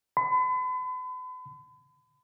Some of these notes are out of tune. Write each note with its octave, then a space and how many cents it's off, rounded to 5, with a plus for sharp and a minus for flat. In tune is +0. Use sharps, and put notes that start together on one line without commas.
B5 +40